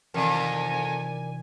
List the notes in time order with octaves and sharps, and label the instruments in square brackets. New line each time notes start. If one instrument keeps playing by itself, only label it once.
[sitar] F2 [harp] C3 D#3 E3 [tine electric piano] A#4 D5 [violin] G#5